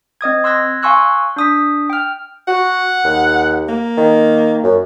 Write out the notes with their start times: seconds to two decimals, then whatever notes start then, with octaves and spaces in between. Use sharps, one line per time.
0.21 C4 D#5 D#6 G#6
0.44 C6 E6 F#6 G#6 A#6
0.83 F5 G#5 C6 C#6 E6 F#6
1.36 D4 D#6 B6
1.90 G5 F6
2.47 F#4 F#5
3.05 D#2
3.68 A#3
3.98 D#3
4.63 F#2